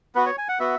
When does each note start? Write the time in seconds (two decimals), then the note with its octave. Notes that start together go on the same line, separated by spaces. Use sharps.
0.15 B3 F#4 B4
0.26 C#5
0.38 G#5
0.49 F#5
0.60 B3 F#4 E5